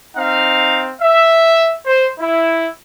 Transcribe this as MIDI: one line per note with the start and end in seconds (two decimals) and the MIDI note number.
0.17 0.90 60
0.17 0.90 63
0.17 0.90 77
1.00 1.73 76
1.86 2.07 72
2.18 2.67 64